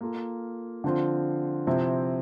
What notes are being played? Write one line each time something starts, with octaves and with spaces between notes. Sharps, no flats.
A#3 F4 A4
D3 F3 C4 F4
C3 F3 C4 E4